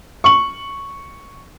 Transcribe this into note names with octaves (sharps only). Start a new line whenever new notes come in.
C#6 F#7